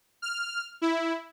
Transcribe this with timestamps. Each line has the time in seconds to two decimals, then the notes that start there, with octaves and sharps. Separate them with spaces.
0.22 F6
0.82 E4